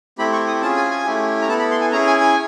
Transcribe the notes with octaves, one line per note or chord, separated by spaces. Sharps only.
A3 C4 E4 G4 B5
C#6
D#6
C#4 F4 G#4 A5
G#5
G#5
A3 C#4 E4 G4
A#5
B3 E4 A4 A5
B5
C6
G#5
C#4 E4 G#4 A#5
G#5
G#5